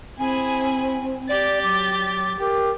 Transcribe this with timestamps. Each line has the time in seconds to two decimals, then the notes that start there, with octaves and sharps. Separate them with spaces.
0.18 C4 E4 G#4 G#5
1.29 G4 D5 A6
1.63 F#3 D6
2.39 G4 A#4